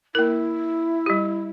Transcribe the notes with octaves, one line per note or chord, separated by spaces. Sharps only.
A#3 E4 A#4
G3 G4